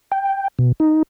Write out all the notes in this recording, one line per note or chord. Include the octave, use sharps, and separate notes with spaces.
G5
B2
D#4